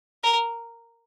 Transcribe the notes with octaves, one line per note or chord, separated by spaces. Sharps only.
A#4